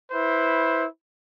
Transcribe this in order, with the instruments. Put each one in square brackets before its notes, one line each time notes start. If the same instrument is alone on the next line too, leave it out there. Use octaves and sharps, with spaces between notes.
[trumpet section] E4 B4 C5